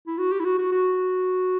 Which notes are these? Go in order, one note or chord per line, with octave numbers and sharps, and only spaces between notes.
E4
F#4
G4
E4
F#4
F#4
F#4